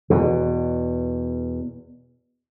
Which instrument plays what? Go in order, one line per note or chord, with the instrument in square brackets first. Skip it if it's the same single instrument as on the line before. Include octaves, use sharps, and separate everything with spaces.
[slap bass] E2 B2